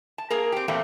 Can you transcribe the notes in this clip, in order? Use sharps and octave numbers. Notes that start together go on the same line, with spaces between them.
A5
A#3 G#4 A#4
C4 G4
E2 A#2 A3 A#3 C4